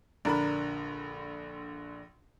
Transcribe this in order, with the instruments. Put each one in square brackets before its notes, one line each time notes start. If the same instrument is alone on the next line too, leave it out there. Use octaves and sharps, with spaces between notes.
[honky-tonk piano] A#1 D3 B5 [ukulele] D4 A#4